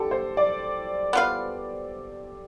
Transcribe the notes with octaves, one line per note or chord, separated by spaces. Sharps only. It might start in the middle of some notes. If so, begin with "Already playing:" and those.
Already playing: D3 G4 A4
C5
D5
B3 F4 B4 F5